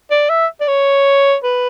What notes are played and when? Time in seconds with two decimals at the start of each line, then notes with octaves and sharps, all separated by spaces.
0.11 D5
0.29 E5
0.61 D5
0.67 C#5
1.43 B4